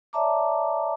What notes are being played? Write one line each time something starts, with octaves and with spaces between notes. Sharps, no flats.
C#5 D5 E5 A5 A#5 D6